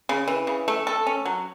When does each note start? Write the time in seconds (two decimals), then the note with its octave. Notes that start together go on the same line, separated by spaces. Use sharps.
0.09 C#3
0.28 E3
0.47 C#3
0.68 A3
0.87 A4
1.07 C#4
1.26 F#3